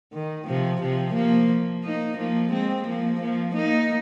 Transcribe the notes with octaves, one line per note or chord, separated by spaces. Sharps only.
D#3
C3 F3
C3 F3
F3 A#3
A#3 D#4
F3 A#3
G#3 C4
F3 A#3
F3 A#3
A#3 D#4